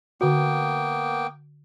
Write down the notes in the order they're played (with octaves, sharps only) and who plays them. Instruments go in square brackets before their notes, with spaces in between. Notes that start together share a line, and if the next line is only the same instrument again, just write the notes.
[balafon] D3 F#4 [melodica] A#3 B3 G5